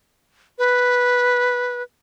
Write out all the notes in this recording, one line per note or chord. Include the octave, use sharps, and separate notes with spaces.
B4